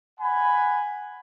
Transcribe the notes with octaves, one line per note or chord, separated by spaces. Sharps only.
F#5 G#5 B5